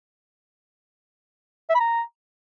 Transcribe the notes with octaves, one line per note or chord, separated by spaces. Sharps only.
E5
B5
A#5